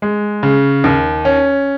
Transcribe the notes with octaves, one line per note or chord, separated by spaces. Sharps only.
G#3
C#3
D#2
C#4